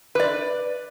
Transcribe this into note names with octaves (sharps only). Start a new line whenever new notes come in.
B4 D5